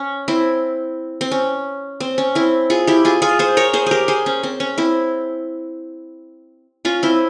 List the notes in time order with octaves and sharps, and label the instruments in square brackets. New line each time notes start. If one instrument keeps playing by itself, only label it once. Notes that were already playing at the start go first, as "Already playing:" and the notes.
Already playing: [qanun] C#4
C4 E4
C4
C#4
C4
C#4
C4 E4
F4 G#4
E4 G4
F4 G#4
F4 G#4
G#4 C5
A#4 C#5
G#4 C5
G4 G#4 A#4
G#4 C5
C#4
C4
C#4
C4 E4
C#4 F4
C4 E4